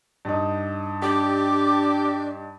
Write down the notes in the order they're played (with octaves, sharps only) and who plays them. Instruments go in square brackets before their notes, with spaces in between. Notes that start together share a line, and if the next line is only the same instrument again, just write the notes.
[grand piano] G2 D#4
[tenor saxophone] D4 [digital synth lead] G4 [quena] D6